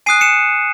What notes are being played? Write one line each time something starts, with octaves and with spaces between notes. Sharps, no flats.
G#5 D#6 F#6 C7 D#7
C#7 E7